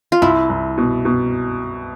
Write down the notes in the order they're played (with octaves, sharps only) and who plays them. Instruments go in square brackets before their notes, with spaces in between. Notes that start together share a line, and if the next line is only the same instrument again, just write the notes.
[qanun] F4
[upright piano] C2 [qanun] E4
[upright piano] C2
B2
B2